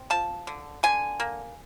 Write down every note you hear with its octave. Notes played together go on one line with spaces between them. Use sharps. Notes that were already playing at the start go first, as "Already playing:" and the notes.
Already playing: C4
F3 A5
D3
D3 G#5
A#3